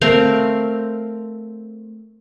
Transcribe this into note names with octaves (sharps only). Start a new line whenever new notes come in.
A3 C4 A#4 F5